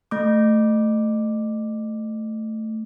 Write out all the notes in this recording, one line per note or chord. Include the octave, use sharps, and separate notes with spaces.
A3 D6